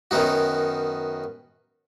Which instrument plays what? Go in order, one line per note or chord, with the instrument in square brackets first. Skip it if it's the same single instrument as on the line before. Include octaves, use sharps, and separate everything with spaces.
[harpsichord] F#2 D#3 B3 D#4 F#4